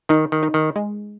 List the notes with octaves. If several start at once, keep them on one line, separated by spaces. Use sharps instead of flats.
D#3 D#4
D#3
D#4
D#3
G#3